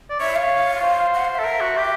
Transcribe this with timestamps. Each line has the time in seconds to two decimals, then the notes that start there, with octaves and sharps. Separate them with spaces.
0.10 D5
0.19 C#5 E5
0.36 C#5 F5
0.83 C5
1.14 F#5
1.25 F5
1.35 A4 E5
1.45 A#4
1.60 F#4
1.77 G4